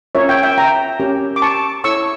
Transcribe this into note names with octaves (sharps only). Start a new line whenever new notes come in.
C#4 F4 A#4 C#5 E5
E5 G5
E5 G5
G5 A#5
C#4 G4 A#4
D6
A5 C#6
E4 A4 C#5 C#6 E6